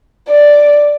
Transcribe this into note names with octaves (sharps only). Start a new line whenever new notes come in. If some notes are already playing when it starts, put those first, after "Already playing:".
D5